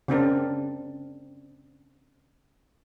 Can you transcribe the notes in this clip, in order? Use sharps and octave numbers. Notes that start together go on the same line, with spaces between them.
C#3 C4 D4 A#4